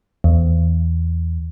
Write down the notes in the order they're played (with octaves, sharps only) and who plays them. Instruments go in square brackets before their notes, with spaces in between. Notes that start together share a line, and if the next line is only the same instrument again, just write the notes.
[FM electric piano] E2